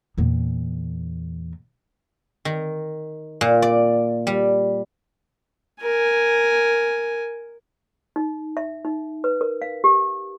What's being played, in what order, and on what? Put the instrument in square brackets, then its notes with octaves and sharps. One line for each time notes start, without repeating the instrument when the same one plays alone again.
[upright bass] E2 A#2
[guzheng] D#3
A#2
D5
G3
[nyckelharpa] A#4 G#5
[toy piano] D#4
E5
D#4
B4
A#4
F5
G4